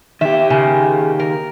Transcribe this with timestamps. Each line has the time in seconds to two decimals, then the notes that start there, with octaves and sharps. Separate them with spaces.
0.21 D#3 G4 E5
0.50 C#3
1.20 A#4